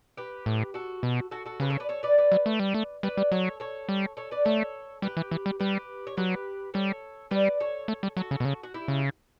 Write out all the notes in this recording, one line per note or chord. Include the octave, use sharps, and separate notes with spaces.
G4 B4
A2
F#4 A4
B2
F#4 A4
F#4 A4
C#3 G4 B4
A4 C#5
B4 D5
A4 C#5
B4 D5
B4 D5
F#3
A3
G3
A3
G3 B4 D5
G3
F#3 A4 C#5
A4 C#5
G3
A4 C#5
B4 D5
A3 A4 C#5
G3 G4 B4
E3
E3
G3
G3 G4 B4
C#5
F#3 G4 B4
G3 A4 C#5
G3 B4 D5
A4 C#5
A3
G3
F#3 F#4 A4
C#3
B2
C#3
F#4
E4 G4
C#3